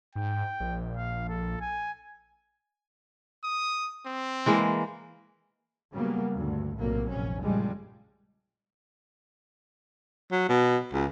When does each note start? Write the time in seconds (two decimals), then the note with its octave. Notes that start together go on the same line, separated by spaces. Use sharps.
0.15 G#2 G5
0.60 A#1
0.97 F5
1.29 A4
1.61 G#5
3.44 D#6
4.06 C4
4.46 E3 G#3 A#3
5.92 C#3 F#3 G3 A#3 B3
6.35 D2 G2
6.78 B1 A2 C3 F#3 G3 A#3
7.10 F1 A#1 C#4
7.43 G2 A#2 C#3 F3 G3 G#3
10.32 F#3
10.49 B2
10.93 C#2